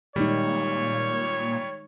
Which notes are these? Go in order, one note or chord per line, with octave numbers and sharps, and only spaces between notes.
A#2 D#3 G3 G#3 D#4 C#5